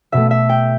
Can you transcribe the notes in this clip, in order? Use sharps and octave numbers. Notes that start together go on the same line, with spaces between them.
B2 A3 E5
E5
G5